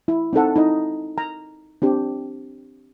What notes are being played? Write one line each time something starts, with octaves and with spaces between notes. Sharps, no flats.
E4
C4 D#4 A4 F#5
D#4 E4 D#5
A#5
C4 D4 G4